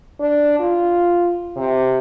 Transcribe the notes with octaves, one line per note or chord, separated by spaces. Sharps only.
D4
F4
C3